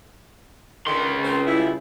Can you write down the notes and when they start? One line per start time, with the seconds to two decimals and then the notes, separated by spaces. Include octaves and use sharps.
0.87 C#2 D3 D#3 C6
1.24 C4 A#4 C5
1.47 G3 E4